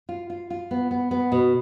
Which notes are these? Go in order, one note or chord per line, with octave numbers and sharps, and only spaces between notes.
F4
F4
F4
B3
B3
B3
B2